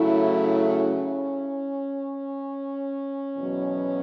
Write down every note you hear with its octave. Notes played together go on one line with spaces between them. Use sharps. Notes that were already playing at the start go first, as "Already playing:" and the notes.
Already playing: C#3 F#3 A3 E4
C#4
E2 B2 F#3